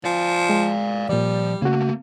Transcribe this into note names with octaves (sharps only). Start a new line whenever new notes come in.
F3 D5 F5
G#3
A#2 F3 G3 D5
C#3 A3 A#3 F#4